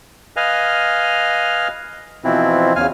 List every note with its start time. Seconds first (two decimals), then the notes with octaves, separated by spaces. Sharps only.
0.36 B4 D#5 F5 G#5 F6
2.24 B2 E3 F3 C4 E4
2.76 E2 C#3 F5 G#5 F6